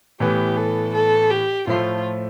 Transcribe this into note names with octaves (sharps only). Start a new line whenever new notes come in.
A2 E3 B3 G4
A4
A4
G4
A2 F3 A3 F4